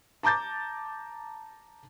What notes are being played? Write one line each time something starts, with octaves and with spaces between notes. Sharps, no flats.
A5 A#5 D6 G6 A6